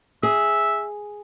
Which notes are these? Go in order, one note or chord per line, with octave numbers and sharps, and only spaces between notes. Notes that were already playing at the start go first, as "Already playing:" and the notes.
G#4 E5